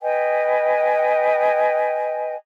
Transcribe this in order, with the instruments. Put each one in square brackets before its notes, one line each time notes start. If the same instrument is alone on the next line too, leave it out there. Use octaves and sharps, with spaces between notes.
[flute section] B4 D#5 G5 G#5